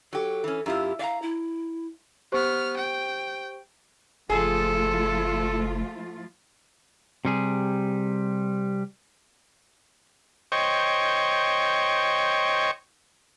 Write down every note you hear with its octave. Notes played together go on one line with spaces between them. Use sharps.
F#3 G4 A4
E3 C#4
F#2 E4 F4 G4
D5 F5 A#5
E4
B3 G4 C5 C#6 F6
G5
F#1 F3 A3 F4 G#4 A4
C3 G3 G#4
C5 C#5 D#5 G5 C#6